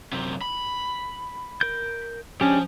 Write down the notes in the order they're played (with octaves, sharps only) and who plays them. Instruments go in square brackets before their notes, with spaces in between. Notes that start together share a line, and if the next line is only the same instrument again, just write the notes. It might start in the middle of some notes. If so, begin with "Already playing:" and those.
[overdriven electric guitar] F#2 C3
B5
[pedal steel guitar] A#4 G6
[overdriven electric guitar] F3 [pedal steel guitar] G#3 D4 G4 [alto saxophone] C#4